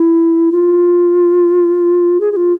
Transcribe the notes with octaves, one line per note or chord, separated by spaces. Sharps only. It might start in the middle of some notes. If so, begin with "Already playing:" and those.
Already playing: E4
F4
G#4
G#4
F4